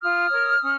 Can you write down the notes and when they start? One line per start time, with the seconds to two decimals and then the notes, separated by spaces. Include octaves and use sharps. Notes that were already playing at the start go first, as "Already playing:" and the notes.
0.01 F4 D#6 F6
0.31 A#4 C#5
0.62 C#4